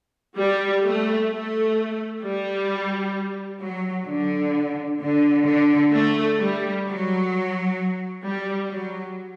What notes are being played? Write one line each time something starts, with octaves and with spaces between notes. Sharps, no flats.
G3
A3
A3
G3
F#3
D3
D3
D3
A3
G3
F#3
G3
F#3